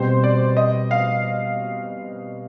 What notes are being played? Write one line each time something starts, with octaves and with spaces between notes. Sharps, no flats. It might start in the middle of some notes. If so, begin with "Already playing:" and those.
Already playing: B2 G3 C4 C5
D5
D#5
F5